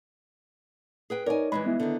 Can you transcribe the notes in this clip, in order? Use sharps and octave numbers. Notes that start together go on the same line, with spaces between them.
G#4 B4 G5
D#4 A#4 C#5 D5 G#5
E3 G3 G#3 B5
B3 E4
D3 D#3